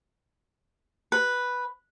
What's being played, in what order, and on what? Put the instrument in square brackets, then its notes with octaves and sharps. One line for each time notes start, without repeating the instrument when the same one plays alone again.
[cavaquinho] B4